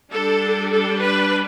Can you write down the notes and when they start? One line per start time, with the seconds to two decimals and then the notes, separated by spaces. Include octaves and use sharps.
0.12 G3 D4 A4
0.72 A4
1.02 B4